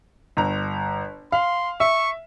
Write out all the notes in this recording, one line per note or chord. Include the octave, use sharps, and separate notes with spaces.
G1 A#5
F5 C6
E5 C#6